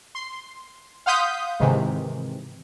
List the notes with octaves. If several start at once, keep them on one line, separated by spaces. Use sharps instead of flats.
C6
F5 F#5 C6 D#6 G6 B6
G#2 C3 D#3 E3 G#3